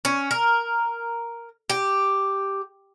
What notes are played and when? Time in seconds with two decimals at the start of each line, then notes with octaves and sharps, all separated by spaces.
0.05 C#4
0.31 A#4
1.70 G4